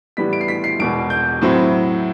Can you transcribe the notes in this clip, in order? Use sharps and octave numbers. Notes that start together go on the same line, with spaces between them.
A2 E3 G3 B3 B6
D7
C7
B6
C7
E1 E2 B2 D7
G6
A2 F#3 C4 E4